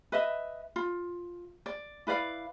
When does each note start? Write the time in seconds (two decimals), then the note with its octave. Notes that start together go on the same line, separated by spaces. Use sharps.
0.12 B4 D#5 E5
0.76 F4
1.66 D5
2.07 E4 B4 D5 F5